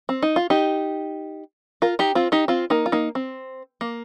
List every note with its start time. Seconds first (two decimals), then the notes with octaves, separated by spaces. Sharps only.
0.09 C4
0.22 D#4
0.36 F4
0.50 D#4 G4
1.82 F4 A#4
1.99 D#4 G4
2.15 C4 F4
2.32 D#4 G4
2.48 C4 F4
2.70 A#3 D#4
2.86 F4
2.92 A#3 D#4
3.15 C4
3.81 A#3